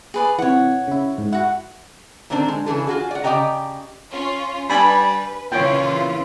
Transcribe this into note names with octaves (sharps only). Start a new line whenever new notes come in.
G#4 B4 D5
C3 E3 C#5 F#5
C#3 E4
G#2
E4 F#4 F#5
A#2 D3 D#3 C4 D4
G#3
C#3 E3 D4 G#4 A4
F4 F#4 G#4
D5 F#5
C#3 G4 D5 D#5 G5 A#5
C#4 F4
G3 D4 B4 G#5 B5
A#2 C#3 E3 F4 C#5 G5